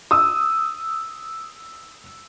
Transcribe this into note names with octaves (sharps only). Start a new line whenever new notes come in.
D#6 E6